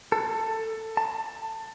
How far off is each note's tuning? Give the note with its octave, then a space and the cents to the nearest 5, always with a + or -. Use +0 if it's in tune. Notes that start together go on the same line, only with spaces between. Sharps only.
A4 +15
A5 +20